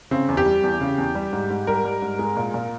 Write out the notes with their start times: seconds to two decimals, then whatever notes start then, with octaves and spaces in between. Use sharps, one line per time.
0.11 C#3 C4
0.29 E2
0.37 G4
0.46 G3
0.63 E2
0.81 C#3
0.98 E2
1.15 G3
1.33 G#2
1.50 G#2
1.67 G3 A#4
1.85 G3
2.02 G#2
2.19 G#3
2.37 A#2
2.54 A#2